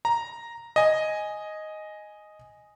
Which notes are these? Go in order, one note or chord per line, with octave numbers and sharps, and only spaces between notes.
A#5
D#5 G#5